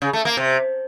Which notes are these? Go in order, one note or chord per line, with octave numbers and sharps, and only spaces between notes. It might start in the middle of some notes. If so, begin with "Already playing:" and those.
C#3
A3
A#3
C3